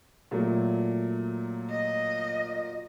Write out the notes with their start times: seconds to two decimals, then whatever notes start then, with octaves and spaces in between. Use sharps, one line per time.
0.31 A#2 F#3 A3
1.70 D#5